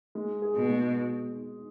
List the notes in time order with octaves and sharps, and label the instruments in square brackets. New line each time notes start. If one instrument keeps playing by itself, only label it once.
[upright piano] G#3
G#4
[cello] B2
[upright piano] G#3